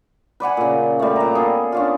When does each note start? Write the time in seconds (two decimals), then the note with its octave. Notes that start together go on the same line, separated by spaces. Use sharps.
0.40 B4 D5 F#5 G#5
0.57 A#2 C#3
0.99 G3 A3
1.16 A#2 A#5
1.35 B3 G#4 A4
1.72 C#4 D4 F4